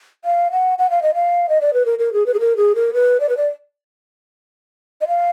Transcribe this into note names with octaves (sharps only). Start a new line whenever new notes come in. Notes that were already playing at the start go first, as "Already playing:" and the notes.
F5
F#5
F#5
F5
D#5
F5
D#5
D5
B4
A#4
A#4
G#4
B4
G#4
A#4
G#4
A#4
B4
D5
B4
D5
D#5
F5